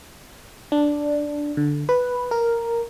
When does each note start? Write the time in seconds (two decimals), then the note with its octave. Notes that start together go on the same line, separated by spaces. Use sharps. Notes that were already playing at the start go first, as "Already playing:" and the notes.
0.72 D4
1.57 D3
1.89 B4
2.31 A#4